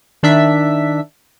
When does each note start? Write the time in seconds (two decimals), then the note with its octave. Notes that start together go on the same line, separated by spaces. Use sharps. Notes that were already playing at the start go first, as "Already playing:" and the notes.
0.23 D#3 D4 E5 B6